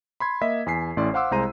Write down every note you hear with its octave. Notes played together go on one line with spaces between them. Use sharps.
B5 C6 G#6
A#3 D#5 E5 B6
E2 G#5 B6 C7
A1 A2 C#4 D5 C6
C5 F5 F#5 C6 D6 E6
C2 G#3 C5 A#5 C6 D#7